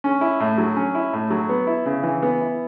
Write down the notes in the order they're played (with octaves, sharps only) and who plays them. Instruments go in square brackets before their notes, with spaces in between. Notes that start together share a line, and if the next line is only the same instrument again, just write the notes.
[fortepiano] C#4
E4
A2
F#3
C#4
E4
A2
F#3
B3
E4
C#3
E3
B3
E4